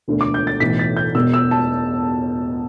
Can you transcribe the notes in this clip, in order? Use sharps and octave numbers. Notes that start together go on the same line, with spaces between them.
E1 D2 D3
D6
G6
A6
B1 A2 E3 B6
A6
G6
E1 E2 B2 E6
E6
A5